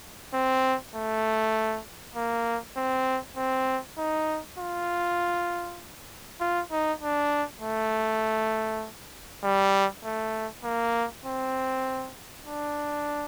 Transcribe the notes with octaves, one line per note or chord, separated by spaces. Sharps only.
C4
A3
A#3
C4
C4
D#4
F4
F4
D#4
D4
A3
G3
A3
A#3
C4
D4